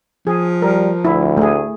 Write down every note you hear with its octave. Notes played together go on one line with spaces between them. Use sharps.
F3 G#4
G3 A#4
D2 E4
A3 G#4